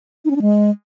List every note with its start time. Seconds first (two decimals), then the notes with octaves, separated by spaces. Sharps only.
0.25 D#4
0.30 C#4
0.36 D4
0.42 G#3